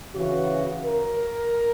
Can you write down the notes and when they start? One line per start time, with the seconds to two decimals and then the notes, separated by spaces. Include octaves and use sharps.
0.13 C#3 E3 F#4
0.84 A#4